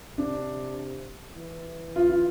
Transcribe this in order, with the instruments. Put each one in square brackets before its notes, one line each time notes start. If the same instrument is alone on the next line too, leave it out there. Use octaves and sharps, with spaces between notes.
[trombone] C3 [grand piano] D4
[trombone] E3
[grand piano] F4
F4